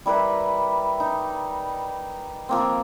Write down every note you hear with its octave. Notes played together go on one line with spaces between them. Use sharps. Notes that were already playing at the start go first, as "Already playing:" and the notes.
G3 E4 A#4 B4
D#4
F3 A#3 C4